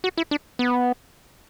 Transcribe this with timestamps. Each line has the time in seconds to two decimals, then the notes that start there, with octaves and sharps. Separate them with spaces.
0.04 F#4
0.17 E4
0.31 D4
0.59 B3